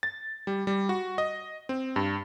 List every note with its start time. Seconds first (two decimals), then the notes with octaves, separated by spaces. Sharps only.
0.03 A6
0.47 G3
0.67 G3
0.89 F#4
1.18 D#5
1.69 C4
1.96 G2